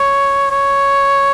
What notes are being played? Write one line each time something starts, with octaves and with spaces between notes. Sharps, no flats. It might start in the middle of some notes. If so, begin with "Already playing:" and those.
Already playing: C#5
C#5